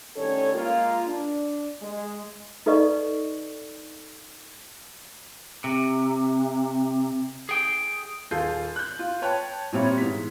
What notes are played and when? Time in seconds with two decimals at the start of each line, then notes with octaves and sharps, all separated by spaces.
0.16 A2 D#3 G3 C#4 A4 C#5
0.54 G#3 A#3 F4
1.08 D4
1.82 G#3
2.66 D#4 A4 B4 D5 D#5 C#6
5.64 C3
7.49 G#4 G5
8.31 D#1 F4 G#4 A4 G6 C7
8.76 F#6 G6
8.99 F4
9.22 B4 C#5 G5 A5 F#6
9.72 A#2 G3 C4 C#5 E5 B5
9.98 G#2 E3 B3 B6